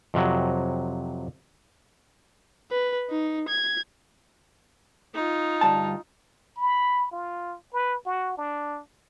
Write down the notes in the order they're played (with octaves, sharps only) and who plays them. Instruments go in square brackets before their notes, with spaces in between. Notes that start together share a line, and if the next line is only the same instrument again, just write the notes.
[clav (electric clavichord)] F2 C3 F#3
[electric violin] B4
D#4
G#6
[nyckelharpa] D#4 F4
[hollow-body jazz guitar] D2 G2 A5
[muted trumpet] B5
F4
B4
F#4
D4